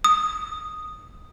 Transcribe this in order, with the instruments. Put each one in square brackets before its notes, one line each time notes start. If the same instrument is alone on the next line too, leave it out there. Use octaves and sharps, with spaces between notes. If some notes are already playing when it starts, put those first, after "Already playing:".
[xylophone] D#6